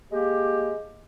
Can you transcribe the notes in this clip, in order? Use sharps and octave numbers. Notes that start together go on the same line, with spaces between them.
G#3 A#3 G4